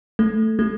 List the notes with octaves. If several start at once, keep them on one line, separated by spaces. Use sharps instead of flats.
A3
A3